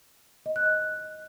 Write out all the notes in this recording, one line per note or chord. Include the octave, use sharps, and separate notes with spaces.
D#5
F#6
F#6